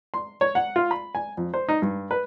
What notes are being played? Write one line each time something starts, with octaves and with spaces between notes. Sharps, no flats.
C6
C#5
F#5
F4
B5
G#5
F2
C5
D#4
G2
B4